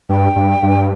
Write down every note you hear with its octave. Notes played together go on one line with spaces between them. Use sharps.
G2 G5
G2
G2